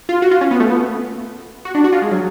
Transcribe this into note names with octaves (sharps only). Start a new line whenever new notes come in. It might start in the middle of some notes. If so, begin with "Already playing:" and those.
F4
F#4
F4
C#4
B3
A3
B3
F#4
D4
F#4
F4
G#3
F#3